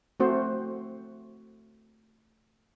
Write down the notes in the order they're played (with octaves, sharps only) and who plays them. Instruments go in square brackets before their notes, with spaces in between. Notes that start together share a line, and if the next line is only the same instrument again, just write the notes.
[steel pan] A3 C4 F#4 C5